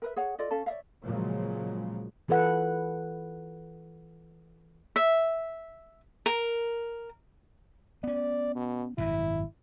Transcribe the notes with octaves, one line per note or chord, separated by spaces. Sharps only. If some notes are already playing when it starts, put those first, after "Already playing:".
A#4 B4 E5
G#4 C#5 F#5
F4 A4 D5 D#5
C#4 A4 F5 A5
C#5 D5 E5 F5
A#2 C#3 F3 F#3 G#3
E3 F4 A4 B4 F#5
E5
A#4
B3 C#4 D5
B2
G#1 F#2 B2 E4